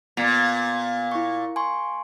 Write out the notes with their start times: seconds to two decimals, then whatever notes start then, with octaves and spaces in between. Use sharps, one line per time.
0.17 A#2 B3 A6
1.12 E4 C#6
1.56 G#5 C6 C#6